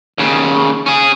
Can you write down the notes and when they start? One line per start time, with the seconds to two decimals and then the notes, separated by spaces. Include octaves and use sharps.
0.18 D#2 C#3
0.86 C#4 G#4